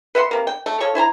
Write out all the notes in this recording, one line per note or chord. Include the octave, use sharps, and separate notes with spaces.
B4 E5 F#5 C6
C3 A#3
G5
A3
F3 A4 C#5 C#6
E4 C5 G#5 A#5